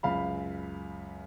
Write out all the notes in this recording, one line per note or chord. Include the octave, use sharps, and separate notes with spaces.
C#2 F#2 F5 B5